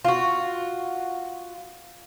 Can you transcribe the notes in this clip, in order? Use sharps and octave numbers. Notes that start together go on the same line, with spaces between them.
F4 F#4